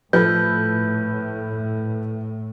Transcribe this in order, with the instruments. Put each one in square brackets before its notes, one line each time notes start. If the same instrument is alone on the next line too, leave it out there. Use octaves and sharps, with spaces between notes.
[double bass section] A2 [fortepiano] F3 [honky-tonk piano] A4 B4 [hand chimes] G6